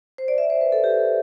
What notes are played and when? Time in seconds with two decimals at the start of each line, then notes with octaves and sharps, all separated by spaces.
0.18 C5
0.28 D5
0.38 E5
0.50 C5
0.61 B4
0.72 A4
0.84 G4